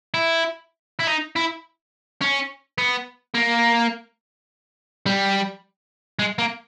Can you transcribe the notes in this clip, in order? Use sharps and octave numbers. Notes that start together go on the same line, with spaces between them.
E4
E4
D#4
E4
C#4
B3
A#3
G3
G#3
A#3